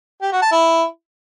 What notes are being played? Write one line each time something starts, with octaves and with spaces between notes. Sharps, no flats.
G4
F#4
A5
E4